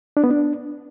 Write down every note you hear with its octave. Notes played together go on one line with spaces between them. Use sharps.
D4
B3
D4